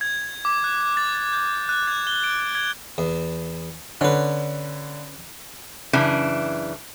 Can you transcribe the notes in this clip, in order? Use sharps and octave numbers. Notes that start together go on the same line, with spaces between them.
G#6
D6
F#6
A6
A6
G6
F#6
G#6
G7
D7
G#6
E2
D3 C#4 B4
F#2 C#3 E3 D4